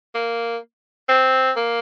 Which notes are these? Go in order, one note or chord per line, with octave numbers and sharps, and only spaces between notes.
A#3
C4
A#3